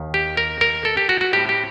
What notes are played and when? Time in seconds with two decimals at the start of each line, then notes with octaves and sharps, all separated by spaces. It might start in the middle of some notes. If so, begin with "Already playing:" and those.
Already playing: D#2 D#3
0.14 G4
0.37 A#4
0.61 A#4
0.85 A4
0.97 G4
1.09 F#4
1.21 F#4
1.33 A2 G3 C4 G4
1.49 G4